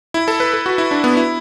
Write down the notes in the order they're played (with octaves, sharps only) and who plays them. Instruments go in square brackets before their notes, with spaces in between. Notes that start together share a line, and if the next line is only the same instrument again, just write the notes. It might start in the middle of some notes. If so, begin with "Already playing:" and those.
[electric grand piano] E4
A4
B4
A4
F#4
E4
D4
B3
E4